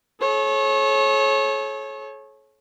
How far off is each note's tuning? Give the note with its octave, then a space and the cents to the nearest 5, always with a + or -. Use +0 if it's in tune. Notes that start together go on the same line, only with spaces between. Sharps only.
A4 -45 C#5 -25